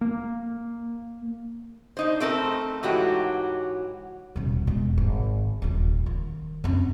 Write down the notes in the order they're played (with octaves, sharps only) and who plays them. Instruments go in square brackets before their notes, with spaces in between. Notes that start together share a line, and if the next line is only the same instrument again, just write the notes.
[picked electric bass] A#3
[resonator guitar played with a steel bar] D4 D#4 C5
A3 C4 A4 A#4 C5
G#2 E3 F#3 F#4 G4
[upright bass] D#1 B1
E1 G#3
G#1
D#1 F4
D#3
F#2 C4